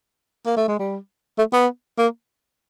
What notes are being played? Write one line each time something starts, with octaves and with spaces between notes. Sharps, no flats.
A#3
A3
G#3
G3
A3
B3
A#3